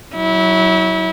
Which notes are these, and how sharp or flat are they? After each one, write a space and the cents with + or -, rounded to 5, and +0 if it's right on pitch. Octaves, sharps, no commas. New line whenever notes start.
F#3 +15 E4 -25